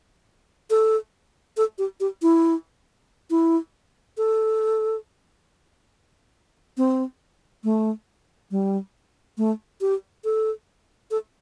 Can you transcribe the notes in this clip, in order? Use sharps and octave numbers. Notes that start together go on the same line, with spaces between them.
A4
A4
G4
G4
E4
E4
A4
C4
A3
G3
A3
G4
A4
A4